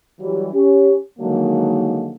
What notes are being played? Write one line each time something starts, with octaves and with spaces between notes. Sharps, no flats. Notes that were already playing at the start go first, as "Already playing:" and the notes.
E3 F#3 G3
C#4 G4
D3 D#3 F3 F#3 G#3 A#3